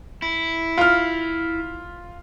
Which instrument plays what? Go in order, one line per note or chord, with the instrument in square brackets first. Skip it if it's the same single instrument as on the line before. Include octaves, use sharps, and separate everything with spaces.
[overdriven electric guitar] E4
[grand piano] F4 F6